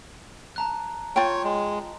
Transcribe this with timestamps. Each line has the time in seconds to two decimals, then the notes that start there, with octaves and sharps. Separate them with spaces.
0.56 A5 A#5 F#6
1.16 F4 C#5 G5
1.44 G#3